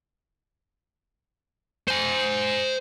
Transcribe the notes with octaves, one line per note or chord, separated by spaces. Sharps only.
C5 G#5